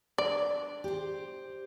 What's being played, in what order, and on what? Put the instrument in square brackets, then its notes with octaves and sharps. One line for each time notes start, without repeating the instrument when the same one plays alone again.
[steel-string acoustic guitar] D4 [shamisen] D5
[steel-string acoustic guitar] G4 C5